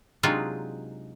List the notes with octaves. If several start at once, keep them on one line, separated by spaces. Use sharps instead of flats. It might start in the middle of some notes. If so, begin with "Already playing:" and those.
C3 F#3 G#3 D4 D#4 F4